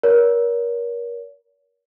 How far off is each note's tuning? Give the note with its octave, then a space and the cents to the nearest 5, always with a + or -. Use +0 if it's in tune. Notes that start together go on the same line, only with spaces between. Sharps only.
A#4 +30 C#5 +40